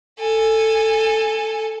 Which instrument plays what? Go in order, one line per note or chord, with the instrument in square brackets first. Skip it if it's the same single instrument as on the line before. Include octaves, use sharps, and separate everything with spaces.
[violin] A4 G#5